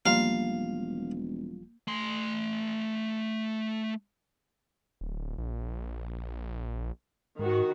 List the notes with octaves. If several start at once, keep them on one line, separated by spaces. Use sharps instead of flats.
E1 F3 G3 A#3 F4 F5
A3 C6
D1
A#1
G#2 D#3 F#4